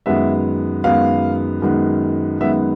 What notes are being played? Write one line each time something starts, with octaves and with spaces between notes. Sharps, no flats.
F#2 D#3 G#3 B3 E5
F#2 D#3 G#3 B3 F5
F#2 D#3 G#3 B3
F#2 D#3 G#3 B3 E5